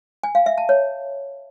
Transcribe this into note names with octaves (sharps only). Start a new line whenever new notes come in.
G#5
F5
E5
A5
C#5